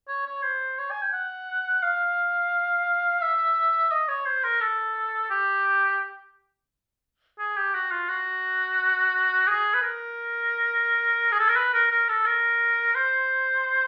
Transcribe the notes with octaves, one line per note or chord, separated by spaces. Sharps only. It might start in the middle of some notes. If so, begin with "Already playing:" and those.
C#5
C#5
C5
C#5
G#5
G5
F#5
F5
E5
D#5
C#5
C5
A#4
A4
G4
G#4
G4
F#4
F4
F#4
G#4
B4
A#4
G#4
A4
A#4
B4
A#4
A#4
A4
A#4
C5